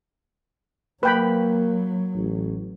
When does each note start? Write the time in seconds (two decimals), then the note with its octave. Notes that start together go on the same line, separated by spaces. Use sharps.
1.03 F#3 A#3 B4 G5 B5
2.15 A1